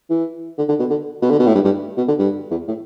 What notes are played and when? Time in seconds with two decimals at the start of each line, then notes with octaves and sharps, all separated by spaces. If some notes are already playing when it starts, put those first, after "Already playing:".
0.10 E3
0.58 D3
0.69 D3
0.79 B2
0.89 D3
1.22 B2
1.30 D3
1.39 B2
1.47 A2
1.55 G2
1.65 G2
1.97 B2
2.08 D3
2.19 G2
2.50 E2
2.68 A2